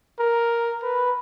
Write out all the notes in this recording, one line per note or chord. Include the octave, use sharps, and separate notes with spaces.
A#4
B4